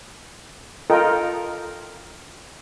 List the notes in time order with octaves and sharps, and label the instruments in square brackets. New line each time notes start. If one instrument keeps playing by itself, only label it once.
[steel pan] F4 A4 A#4 D#5 G5